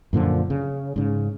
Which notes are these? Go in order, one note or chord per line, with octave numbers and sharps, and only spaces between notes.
F#2 A#2 D3 F3
C#3
G#2 C#3